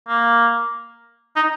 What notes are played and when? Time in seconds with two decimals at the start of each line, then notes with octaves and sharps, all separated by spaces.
0.08 A#3
1.36 D#4